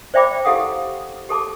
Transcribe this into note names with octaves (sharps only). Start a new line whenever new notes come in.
C5 D5 E5 G5 B5 D6
E4 G4 A4 F5 F#5 D#6
G4 A4 A5 D6